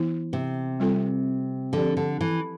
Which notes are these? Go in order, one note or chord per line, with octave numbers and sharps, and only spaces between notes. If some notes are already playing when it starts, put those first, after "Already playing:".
Already playing: E3 B3 E4
C3
G3 C4 F4 A4
D3 F3 C4 G4 D5
D3
E3